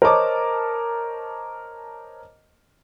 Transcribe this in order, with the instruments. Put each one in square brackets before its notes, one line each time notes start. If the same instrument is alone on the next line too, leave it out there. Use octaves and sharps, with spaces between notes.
[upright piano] A#4 C5 C#5 D#5 A5 D6